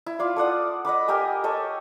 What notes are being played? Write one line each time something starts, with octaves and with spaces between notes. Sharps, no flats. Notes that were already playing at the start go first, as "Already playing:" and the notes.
E4
F4 D5 F5
A4 D5 F#5 D#6
D#5 F#5 B5 D6
G4 A#4 D#5 G#5
A4 C#5 D#5